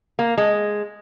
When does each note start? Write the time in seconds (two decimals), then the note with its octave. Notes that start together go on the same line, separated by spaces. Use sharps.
0.19 A#3
0.38 G#3